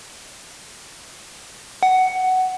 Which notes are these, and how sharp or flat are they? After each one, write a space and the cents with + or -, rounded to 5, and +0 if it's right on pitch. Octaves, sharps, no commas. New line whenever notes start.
F#5 +10